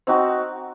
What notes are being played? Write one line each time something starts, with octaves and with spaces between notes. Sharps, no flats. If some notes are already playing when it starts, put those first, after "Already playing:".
C4 D#4 F#4